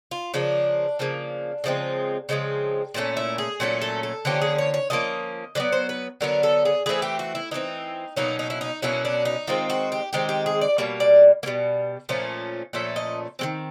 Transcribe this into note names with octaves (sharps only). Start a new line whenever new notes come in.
F4
C#3 F3 A#3 D4
C#3 F3 A#3
C#3 F3 G#3 C4
C#3 F3 G#3 C4
A#2 F#3 A3 C#4
E4
G#4
A#2 F#3 A3 C#4
A4
A4
D3 F3 A#3 C#4 G4
G#4
C#5
C#5
D3 F3 A#3 C#4 D#5
D3 F#3 B3 D5
C5
B4
D3 F#3 B3 A#4
A4
G#4
E3 A3 C4 G#4
G4
F#4
E4
E3 A3 C4 D#4
B2 F#3 A#3 C#4 D#4
D#4
E4
D#4
B2 F#3 A#3 C#4 E4
D4
D#4
D#3 G#3 C4 F4
F#4
G4
D#3 G#3 C4 G4
G4
G#4
D5
B2 G3 A#3 C#5
D5
A#3
B2 G3
A#2 F3 A3 C#4
A#2 F3 A3 C#4 E5
D#5
D#3 G#3 C4